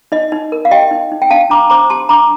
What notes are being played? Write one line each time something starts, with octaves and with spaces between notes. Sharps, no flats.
D#4 D#5
D#4
A#4
F5
G4 D#5 G5
D#4
D#4
G5
D4 F5 A5
D4 A#5 D6
C5 A#5 D6
G4 A5 C6
D4 A#5 D6